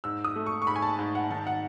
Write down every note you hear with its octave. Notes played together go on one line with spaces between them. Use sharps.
G#2 E6
D#6
A3
C#6
C#6
G#2 B5
G#5
A5
G#2
F#5
D#3 A5
F#5